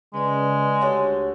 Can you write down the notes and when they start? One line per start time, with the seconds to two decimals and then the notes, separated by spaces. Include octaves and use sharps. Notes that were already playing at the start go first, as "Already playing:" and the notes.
0.14 C#3 G#3 B4 D5
0.81 D2 G4 A4 C#5 F#5